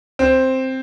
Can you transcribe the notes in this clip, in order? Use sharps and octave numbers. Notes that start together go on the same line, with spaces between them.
C4